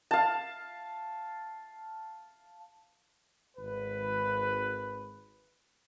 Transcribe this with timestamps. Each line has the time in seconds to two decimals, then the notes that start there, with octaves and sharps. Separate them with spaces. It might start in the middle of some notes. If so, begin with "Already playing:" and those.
0.11 F5 A5
3.56 G#1 B4